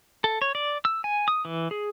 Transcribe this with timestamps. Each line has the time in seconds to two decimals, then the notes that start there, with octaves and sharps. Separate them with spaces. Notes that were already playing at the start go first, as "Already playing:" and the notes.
0.24 A4
0.42 C#5
0.55 D5
0.85 E6
1.04 G#5
1.28 D#6
1.45 E3
1.71 G#4